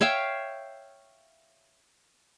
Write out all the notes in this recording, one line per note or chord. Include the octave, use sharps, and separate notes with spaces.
C#5 E5 F5 G5